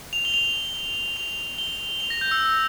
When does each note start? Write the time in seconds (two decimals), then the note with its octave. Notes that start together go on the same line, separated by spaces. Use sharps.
0.13 F7
0.25 G7
0.34 F7
1.17 F7
1.58 G7
2.00 F7
2.10 A#6
2.21 G6
2.31 E6